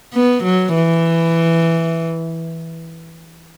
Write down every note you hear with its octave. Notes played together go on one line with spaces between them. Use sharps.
B3
F#3
E3